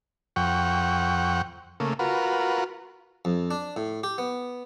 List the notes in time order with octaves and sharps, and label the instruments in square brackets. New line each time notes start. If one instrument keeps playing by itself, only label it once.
[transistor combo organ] F2 F#5 G5 C#6
C#3 A3 A#3
F4 F#4 A#4 B4
[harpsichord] F2
D4
A2
G4
B3